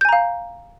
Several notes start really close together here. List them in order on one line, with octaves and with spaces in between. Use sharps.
G6 G#5 A#5 F5